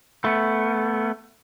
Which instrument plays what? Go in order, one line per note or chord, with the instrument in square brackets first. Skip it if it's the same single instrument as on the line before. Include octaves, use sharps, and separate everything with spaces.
[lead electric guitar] A3 B3